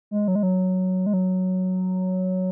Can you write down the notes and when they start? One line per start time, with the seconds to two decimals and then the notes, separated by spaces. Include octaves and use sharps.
0.11 G#3
0.28 F#3
0.35 G#3
0.43 F#3
1.06 G#3
1.13 F#3